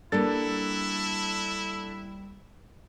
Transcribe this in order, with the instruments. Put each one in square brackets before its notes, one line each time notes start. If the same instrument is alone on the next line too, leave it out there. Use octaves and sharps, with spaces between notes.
[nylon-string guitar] G3 A#3 [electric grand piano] D4 A4 A6 [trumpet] E4